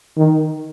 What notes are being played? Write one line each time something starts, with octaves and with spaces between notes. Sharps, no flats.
D#3